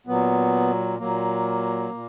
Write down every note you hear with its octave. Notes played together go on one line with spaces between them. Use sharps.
A#2 F#3 B3
A#2 F#3 A#3
A#2